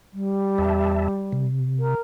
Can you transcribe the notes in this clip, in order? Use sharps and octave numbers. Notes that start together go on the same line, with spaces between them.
G3
E2 E5 A5
C3
A#4